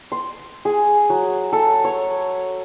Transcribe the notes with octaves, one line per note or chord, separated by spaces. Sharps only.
C6
G#4
F#3
A4
C#5